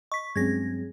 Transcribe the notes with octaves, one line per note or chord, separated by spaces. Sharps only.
D#5 C#6 B6
G2 F#3 G#3 C4 C#4 G#4 G#6 A#6